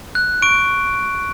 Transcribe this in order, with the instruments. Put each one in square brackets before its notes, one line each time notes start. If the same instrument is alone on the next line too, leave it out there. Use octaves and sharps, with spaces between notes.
[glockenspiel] F#6
C#6 D7